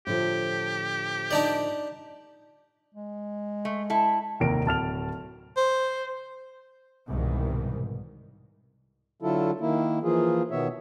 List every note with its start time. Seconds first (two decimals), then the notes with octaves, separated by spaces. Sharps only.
0.07 A2 D3 F3 G4
1.31 D4 D#4 D5
2.94 G#3
3.65 A3
3.90 E4 A4
4.40 F1 D#2 A#4 D7
4.66 D1 A5 F6 F7
5.57 C5
7.08 C2 G#2 B2 D#3 E3 G3
9.22 D3 F#3 E4 F4 A4
9.60 D#3 A#3 E4
10.03 E3 F3 A#3 F4 G#4
10.51 B2 D#3 B3 C#5 E5